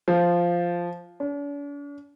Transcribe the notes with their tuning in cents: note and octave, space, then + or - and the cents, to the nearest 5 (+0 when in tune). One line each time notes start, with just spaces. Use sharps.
F3 -5
D4 -45